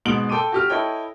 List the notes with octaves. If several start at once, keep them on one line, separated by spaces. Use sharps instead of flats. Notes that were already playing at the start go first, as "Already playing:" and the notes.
G#2 B2 D7 F#7
A4 G5 C6 D6 D#7
F#4 G4 F6
E4 A4 C#5 D#5 G5